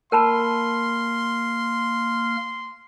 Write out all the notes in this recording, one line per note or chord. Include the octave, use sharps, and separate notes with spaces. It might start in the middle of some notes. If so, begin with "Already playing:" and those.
A#3 A#4 A5 B5 C6 F6